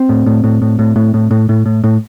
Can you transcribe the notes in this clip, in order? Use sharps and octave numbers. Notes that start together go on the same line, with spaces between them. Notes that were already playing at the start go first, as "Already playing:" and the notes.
Already playing: C4
A2
A2
A2
A2
A2
A2
A2
A2
A2
A2
A2